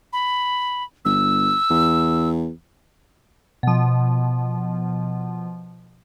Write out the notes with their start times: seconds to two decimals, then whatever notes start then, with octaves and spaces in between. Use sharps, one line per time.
0.13 B5
1.05 G1 E6
1.70 E2
3.63 B2 F3